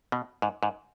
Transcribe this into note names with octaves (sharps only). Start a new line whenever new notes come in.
B2
G#2
G#2